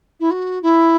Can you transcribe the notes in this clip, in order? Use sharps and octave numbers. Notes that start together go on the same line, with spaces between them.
E4
F#4
E4